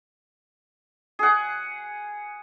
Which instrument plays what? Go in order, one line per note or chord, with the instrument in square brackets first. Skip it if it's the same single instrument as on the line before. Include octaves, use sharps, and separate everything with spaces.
[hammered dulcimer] G#4 F#5